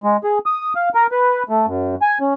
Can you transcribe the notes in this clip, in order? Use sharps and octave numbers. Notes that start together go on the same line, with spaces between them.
G#3
G#4
D#6
F5
A#4
B4
A3
F#2
G#5
C#4